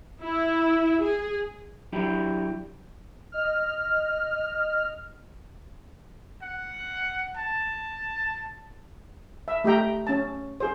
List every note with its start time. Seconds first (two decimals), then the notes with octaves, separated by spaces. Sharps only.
0.21 E4
1.01 G#4
1.92 F#3 D4 E4 G4
3.32 D#5 F6
6.42 F#5
7.36 A5
9.48 E5
9.64 A3 G4 D#5 G5 A#5
10.07 C#4 A5
10.60 G#4 C5